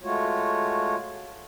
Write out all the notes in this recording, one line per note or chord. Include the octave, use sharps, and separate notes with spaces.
G#3 A3 F4 F#4 C#5